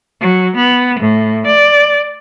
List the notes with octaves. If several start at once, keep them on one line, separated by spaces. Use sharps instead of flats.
F#3
B3
A2
D5